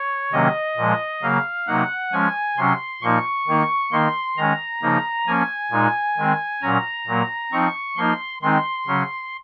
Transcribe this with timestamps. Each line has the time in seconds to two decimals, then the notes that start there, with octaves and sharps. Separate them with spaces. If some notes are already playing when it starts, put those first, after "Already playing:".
Already playing: C#5
0.32 C3 D#3 F#3 A#3 C#4 D#5
0.77 A#2 F3 G#3
1.22 C#3 F#3 A#3 F5
1.67 C3 F#3 A#3 D#4 F#5
2.12 F3 G#3 C#4 G#5
2.57 C3 F#3 C#4 C6
3.02 A#2 F3 A#3 D#4 C#6
3.47 D#3 A#3 D#4
3.92 D#3 A#3 D#4 C6
4.37 D#3 G#3 C#4 A#5
4.82 C#3 F3 A#3 D#4
5.27 F3 A#3 C#4 G#5
5.72 A#2 G#3 D#4
6.17 D#3 G#3 C4
6.62 A#2 F#3 C#4 A#5
7.07 A#2 F#3 A#3
7.52 F3 C4 D#4 C#6
7.97 F3 A#3 D#4 C6
8.42 D#3 G#3 C4 D#4 C6
8.87 C#3 F#3 C#4